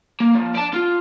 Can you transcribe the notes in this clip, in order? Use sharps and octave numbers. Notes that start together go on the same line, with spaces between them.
A#3
F3
D5 A5
F4